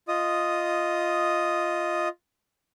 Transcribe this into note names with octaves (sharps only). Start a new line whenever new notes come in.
F4 D#5 D#6